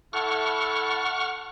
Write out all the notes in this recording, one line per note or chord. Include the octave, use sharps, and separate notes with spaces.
E4 A4 F#5 C#6 F6